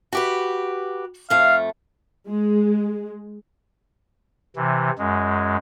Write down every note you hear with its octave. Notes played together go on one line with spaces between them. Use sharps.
F#4 G4 B4
F2 A3 F5
G#3
C3 E3
F#2 G#3